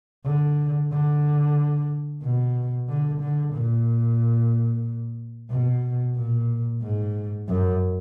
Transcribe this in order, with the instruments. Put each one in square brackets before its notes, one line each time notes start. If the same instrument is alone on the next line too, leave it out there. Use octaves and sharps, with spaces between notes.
[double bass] D3
D3
B2
D3
D3
A#2
B2
A#2
G#2
F#2